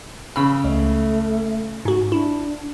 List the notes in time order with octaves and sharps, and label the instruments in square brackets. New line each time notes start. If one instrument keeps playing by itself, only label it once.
[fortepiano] C#3 B5 [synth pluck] E6
[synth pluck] C#2 [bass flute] A3
[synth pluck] G#2 F#4
[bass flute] D4 [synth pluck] E4